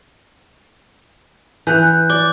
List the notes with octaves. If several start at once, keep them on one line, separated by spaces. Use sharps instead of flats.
E3 F#5 F#6 G6
D5 D6 G7